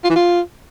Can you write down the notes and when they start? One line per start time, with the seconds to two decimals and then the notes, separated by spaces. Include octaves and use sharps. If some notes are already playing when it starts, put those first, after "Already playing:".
0.04 F4
0.10 E3
0.16 F4